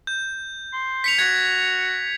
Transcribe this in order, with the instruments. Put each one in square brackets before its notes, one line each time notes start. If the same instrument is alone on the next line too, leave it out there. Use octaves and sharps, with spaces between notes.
[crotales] G6
[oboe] C6
[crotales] B6 C#7 F7
[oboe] F#4 [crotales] G#6